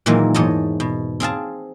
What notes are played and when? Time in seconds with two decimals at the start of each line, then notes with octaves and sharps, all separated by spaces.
0.06 A#2 D#3 E3 F#3 G#3 A#3
0.34 E2 G#2 C#5 D#5 A5
0.80 B2
1.20 C4 G#4 F5 A5